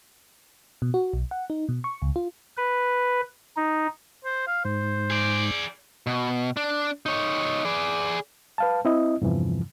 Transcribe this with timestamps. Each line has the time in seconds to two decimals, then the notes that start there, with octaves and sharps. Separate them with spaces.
0.82 B2
0.94 F#4
1.13 B1
1.31 F#5
1.50 D#4
1.69 B2
1.84 C#6
2.02 C#2
2.16 F4
2.57 B4
3.57 D#4
4.25 C5
4.47 F5
4.65 G#2 C5
5.11 G#4 D5
6.07 B2
6.57 D4
7.06 D#4 C#5
7.65 G#4 D5
8.58 B4 F5 A5
8.85 C4 E4 D#5
9.22 E2 G2 C3 E3 F3